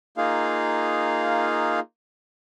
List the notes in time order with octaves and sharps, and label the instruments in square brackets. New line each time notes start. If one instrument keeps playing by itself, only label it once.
[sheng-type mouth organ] A#3 D#4 F4 G#4 F5